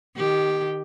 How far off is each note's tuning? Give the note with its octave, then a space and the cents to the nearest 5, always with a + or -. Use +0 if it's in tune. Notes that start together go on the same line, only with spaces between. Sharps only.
D#3 -20 G4 +0